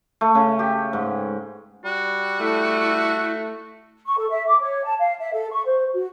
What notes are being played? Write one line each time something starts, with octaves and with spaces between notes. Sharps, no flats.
A3
C#3
G4
G#2
G3 F#4
A3 E4
C#6
A4
E5
D6
C#5
A5
F5
E5
A4
C#6
C5
F#4